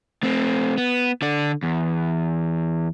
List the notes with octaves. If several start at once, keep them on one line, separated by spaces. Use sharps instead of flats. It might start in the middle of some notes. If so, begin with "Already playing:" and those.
A3 C4
B3
D3 D5
E2